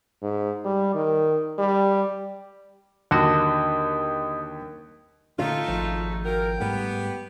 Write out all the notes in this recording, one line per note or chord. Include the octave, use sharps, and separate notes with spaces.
G#2
G3
D#3
G3
D#2 D3 F#4 D#5 D#6
A#2 D3 A3 C#4 D#4 F4
G#1 F3
F4 F#4 A#4 G5
G#2 G3 A3 B3 G4